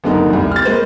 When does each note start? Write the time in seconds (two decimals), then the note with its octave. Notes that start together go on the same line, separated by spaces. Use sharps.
0.04 F#1 D3 D#4 A#4
0.30 F1 C2
0.51 F6 A6
0.65 G#3 A#3 B4 C5